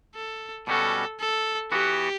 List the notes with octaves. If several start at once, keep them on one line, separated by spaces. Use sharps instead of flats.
A4
B2 G3 C#4 F#4 A4
A4
E3 B3 F#4 G4